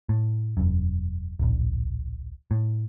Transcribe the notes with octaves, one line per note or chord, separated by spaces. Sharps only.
A2
E1 F#2
D1 A#1
A2